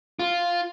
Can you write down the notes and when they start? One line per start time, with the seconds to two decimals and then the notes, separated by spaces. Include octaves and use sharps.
0.19 F4